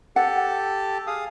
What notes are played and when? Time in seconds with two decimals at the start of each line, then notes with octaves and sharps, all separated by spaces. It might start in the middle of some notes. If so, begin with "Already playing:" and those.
0.16 G4 A4 F#5 A5
1.07 G#4 F5 D#6